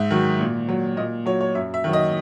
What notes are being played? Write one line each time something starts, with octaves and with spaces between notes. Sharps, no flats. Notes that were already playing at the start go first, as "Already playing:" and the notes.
Already playing: G#2 E5
D#3 F#3
A#2
F#3
A#2 D#5
F#3 C#5
C#5
F#2 E5
E5
D#3 F#3
D#5